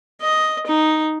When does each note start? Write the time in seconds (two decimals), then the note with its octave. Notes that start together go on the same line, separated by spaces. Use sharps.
0.21 D#5
0.67 D#4